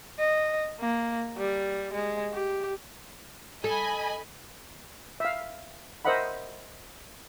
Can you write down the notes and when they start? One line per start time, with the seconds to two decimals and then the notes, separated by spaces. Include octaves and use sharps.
0.19 D#5
0.80 A#3
1.38 G3
1.93 G#3
2.34 G4
3.64 A4 D#5 G#5 B5
5.20 E5 F5
6.05 A#4 C5 D#5 E5 F#5 B5